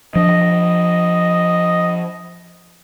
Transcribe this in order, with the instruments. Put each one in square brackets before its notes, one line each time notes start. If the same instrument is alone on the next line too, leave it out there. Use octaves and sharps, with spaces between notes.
[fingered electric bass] F3 D4 [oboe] D#5